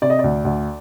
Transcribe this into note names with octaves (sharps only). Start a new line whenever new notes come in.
C3 D5
D#5
D2 D5
D2